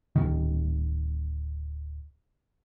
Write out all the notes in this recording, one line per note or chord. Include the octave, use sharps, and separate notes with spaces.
D1 B1 D#3